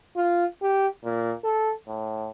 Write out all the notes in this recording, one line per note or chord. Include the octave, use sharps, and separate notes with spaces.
F4
G4
A#2
A4
A2